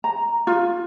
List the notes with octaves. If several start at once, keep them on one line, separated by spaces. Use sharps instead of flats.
A#5
F4